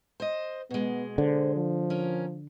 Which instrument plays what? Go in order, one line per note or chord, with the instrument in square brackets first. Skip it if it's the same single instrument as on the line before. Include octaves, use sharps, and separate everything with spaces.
[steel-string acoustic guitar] C5 D#5
[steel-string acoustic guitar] B2 G#3 [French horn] B3
[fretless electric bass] D3 [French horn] C5
[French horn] F3
[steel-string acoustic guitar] C#4 A#4